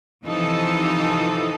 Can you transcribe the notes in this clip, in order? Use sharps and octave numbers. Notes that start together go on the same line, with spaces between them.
C3 E3 F3 D#4 A4